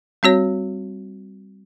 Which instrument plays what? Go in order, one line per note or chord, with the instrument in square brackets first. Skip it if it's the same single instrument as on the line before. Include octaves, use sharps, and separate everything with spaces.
[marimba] G3 C4 F#4 C#5